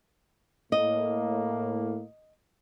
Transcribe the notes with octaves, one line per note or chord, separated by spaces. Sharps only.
A2 A#3 D#5